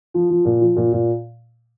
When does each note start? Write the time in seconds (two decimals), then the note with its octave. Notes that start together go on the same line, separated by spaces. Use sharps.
0.14 F3
0.30 F3
0.45 A#2
0.61 F3
0.76 A#2
0.92 A#2